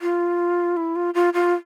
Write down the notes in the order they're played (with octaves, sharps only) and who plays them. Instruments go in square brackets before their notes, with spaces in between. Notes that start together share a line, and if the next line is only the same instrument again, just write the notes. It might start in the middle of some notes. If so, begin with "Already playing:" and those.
[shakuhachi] F4
E4
F4
F4
F4